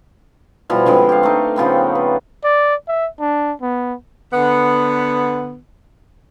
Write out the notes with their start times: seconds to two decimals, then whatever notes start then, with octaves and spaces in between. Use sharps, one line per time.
0.70 B2 F3 G3 E4
0.86 D3 F3 G#3 C4
1.09 G4 F5
1.23 A3 D#4
1.56 C#3 F3 B3 C4
1.95 B4
2.44 D5
2.88 E5
3.20 D4
3.62 B3
4.32 D3 B3